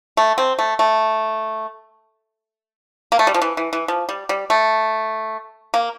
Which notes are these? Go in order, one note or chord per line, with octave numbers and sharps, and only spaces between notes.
A3
C4
A3
A3
A#3
A3
G3
F3
E3
E3
E3
F3
G3
G3
A3
A#3